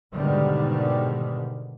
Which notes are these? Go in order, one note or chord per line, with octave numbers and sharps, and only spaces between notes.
G#2 B2 D3 D#3 G3